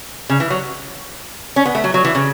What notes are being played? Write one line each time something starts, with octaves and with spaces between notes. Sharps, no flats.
C#3
E3
F#3
C#4
B3
A3
F#3
F#3
E3
C#3